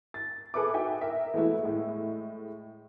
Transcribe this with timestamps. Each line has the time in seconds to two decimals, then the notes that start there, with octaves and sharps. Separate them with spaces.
0.14 A6
0.54 G#4 A4 B4 E5 D6
0.74 D#4 F#4 E5 G5 G#5
1.01 A#4 E5
1.34 E3 G#3 A3 B3 E4 F#4
1.63 A2 G#3